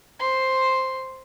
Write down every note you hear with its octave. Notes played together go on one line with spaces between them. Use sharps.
C5 C6